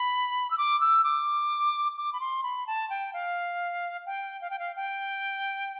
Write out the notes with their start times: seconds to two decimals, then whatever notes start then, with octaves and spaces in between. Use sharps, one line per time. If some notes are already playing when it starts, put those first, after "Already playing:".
Already playing: B5
0.51 E6
0.58 D6
0.81 E6
1.04 D6
1.97 D6
2.13 B5
2.20 C6
2.43 B5
2.67 A5
2.90 G5
3.13 F5
4.06 G5
4.41 F5
4.50 G5
4.59 F5
4.76 G5